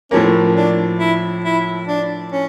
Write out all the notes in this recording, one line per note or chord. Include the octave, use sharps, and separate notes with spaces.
A2 F3 A#3 C#4
D4
E4
E4
D4
C#4